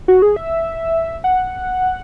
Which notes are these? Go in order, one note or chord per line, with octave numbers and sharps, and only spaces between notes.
F#4
G#4
E5
F#5